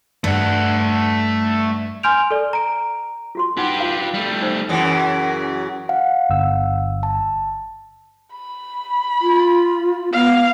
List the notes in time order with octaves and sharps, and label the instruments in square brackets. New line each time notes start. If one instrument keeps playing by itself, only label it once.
[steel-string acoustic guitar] G2 [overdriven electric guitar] A3 F#5
[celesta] G#5 C6 F6 G6 D7 F7
A4 D5
A#5 D7
[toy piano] F4 F#4 C6
[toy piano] D#4 E4 F#5 [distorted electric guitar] G4 B4
[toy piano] F4 F5 A#5
[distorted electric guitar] G3 A3
[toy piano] D#4 C5
[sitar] F#2 C#3 E3
[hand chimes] F5 F#5
[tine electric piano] G1 E6
[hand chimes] A5
[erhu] B5
[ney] F4
[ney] B3 [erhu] F5